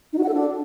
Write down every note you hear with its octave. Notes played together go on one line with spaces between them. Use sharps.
D#4
F#4
F#5
A4
D4